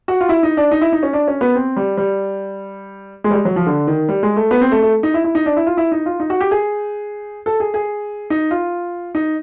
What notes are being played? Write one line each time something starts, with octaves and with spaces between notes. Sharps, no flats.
F#4
F4
E4
D#4
D4
D#4
E4
D#4
C#4
D4
C#4
B3
C4
G3
G3
G#3
G3
G#3
F#3
F3
D3
D#3
G3
G#3
A3
B3
C4
A3
A3
D#4
E4
E4
D#4
D4
E4
F4
E4
D#4
F4
D#4
F#4
G4
G#4
A4
G#4
G#4
D#4
F4
D#4